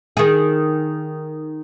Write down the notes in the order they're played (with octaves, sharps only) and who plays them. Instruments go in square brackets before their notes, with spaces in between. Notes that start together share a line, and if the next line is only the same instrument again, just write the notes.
[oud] D#3 G#4